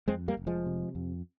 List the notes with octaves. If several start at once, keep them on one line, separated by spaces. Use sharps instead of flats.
F2 G#3 C4
G3 A#3
F1
F3 G#3
C3
F2